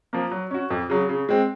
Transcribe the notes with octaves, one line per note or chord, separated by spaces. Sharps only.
F3 A#3
F#3
C#4 F#4
F2
C#3 F#3
C#3
G#3 C4